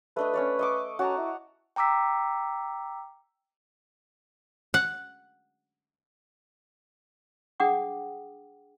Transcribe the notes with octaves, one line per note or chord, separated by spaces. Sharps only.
A3 D4 B4 D#5
C#4 C#5 D5
D#5 C#6 D6
C#4 F#4 A5 A#5
E4
G5 A#5 D6 E6 B6
F#5
D4 G#4 F#5 G5 D6 D#6